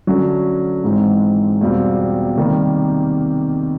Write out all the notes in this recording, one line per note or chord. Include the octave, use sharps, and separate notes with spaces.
D3 F#3 A3 C#4
G#2 E3 G#3 C4 D#4
E2 B2 G3 C4 F4
C3 D#3 G3 A#3 D#4